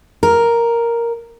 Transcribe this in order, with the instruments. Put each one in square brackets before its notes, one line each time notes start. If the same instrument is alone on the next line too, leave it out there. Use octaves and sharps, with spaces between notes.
[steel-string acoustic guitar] A#4